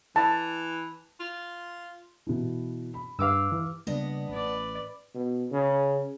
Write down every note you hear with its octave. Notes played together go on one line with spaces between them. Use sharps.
E3 A5
F4
B2 E3
B5
G2 G4 B4 F5 D6 E6
E3
C#3 G3 A#3 B3 D4 D#5
A1 B4 D5
B2
C#3